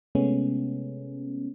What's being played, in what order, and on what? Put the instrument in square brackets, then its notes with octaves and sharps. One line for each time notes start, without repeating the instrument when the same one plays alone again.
[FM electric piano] C3 G#3 A3 B3 C#4